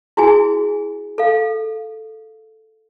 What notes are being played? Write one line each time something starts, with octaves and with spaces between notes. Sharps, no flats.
E4 F#4 G#4 G#5
A4 F5